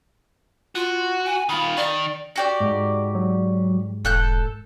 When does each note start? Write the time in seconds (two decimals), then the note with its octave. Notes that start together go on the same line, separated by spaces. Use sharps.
0.75 F4 F#4
1.25 G#5
1.49 D#3 F4 B5
1.77 D#3 D5
2.36 F#4 G4 D5
2.60 G#2
3.15 F#3
4.05 E1 A4 F#6 G6